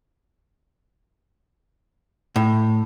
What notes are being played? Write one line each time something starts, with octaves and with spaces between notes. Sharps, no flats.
A2